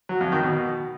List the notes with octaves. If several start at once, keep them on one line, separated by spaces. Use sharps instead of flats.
F#3
F2
D#3
B2